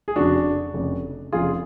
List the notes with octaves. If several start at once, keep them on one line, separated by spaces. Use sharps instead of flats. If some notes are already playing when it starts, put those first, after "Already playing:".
G#4
F1 F2 C#3 D4 F#4
F1 F2 C#3
F1 F2 C#3 F4 G#4